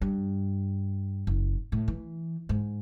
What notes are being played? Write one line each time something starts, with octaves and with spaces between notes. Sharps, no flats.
G2
F#1
A2
E3
G#2